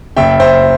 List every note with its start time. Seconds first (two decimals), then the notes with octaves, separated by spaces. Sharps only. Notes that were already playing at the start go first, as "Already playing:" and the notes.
0.17 F#1 E5 G5
0.40 C5 E5